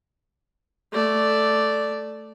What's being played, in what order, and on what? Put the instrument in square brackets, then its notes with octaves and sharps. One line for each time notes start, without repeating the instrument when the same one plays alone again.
[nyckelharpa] A3 D5